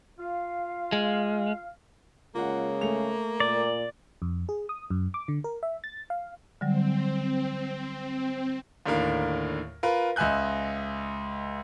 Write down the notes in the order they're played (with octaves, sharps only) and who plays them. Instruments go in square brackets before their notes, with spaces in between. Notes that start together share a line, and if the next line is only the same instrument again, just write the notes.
[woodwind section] F4 F5
[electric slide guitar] G#3
[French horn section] C#3 G#3 [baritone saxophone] A#3 [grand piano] F4 F#5
[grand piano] A3 F7
[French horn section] A#2 [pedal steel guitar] D5
[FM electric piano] F2
G#4
D#6
F#2
D6
D3
A#4
E5
A6
F5
[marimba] D3 F#3 G3 [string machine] C4
[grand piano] D#2 A2 D3 A#4 F5
F4 A#4 B4
C#2 D#5 E5 G#5 F#6 G6